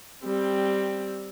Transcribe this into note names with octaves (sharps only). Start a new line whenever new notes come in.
G3 C4